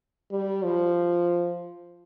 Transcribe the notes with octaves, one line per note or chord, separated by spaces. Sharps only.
G3
F3